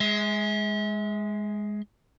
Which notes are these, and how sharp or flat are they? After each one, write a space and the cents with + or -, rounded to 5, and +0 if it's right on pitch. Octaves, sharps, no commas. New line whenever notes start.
G#3 +0 E5 -40